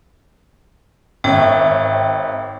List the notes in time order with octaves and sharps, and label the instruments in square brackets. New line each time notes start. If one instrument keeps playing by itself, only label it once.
[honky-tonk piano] G#1 C#5 E5 [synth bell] G5